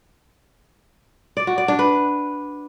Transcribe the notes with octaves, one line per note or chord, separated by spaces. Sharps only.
D5
F#4
D5
D4
B4